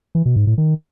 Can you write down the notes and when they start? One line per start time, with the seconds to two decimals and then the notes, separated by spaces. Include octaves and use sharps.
0.15 E3
0.26 B2
0.36 G#2
0.47 A2
0.58 D#3